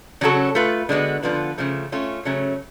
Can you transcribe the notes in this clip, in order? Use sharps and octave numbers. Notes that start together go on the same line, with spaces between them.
C#3 F#3 C#4 F#4 A4
A3 F4 B4
D3 G#3 B3 F#4
D3 F3 B3 F4 B4
C#3 F3 A3
A3 C#4 F4
C#3 F#3 A3 C#4